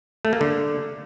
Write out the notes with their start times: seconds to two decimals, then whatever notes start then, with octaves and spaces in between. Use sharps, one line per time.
0.25 A3
0.33 A#3
0.41 D3